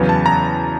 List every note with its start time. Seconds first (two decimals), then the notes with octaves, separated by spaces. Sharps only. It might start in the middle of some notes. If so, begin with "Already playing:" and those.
Already playing: E2 C#3 F#3 B3
0.09 A5
0.26 A#5